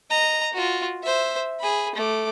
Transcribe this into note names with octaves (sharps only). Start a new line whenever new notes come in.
D#5 A#5
F4 F#4
C5 E5
G#4 B5
A3 D6